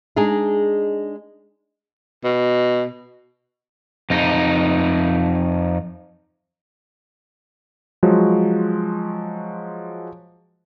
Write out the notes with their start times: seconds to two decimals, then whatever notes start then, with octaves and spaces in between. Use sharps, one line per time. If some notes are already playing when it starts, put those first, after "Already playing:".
0.16 G#3 D4 D#4 G#4
2.24 B2
4.10 F2 D#4
8.03 F3 F#3 G#3 F#4